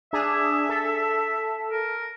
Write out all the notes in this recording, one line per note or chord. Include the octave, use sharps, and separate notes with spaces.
D4 G#4 E5
A4
A#4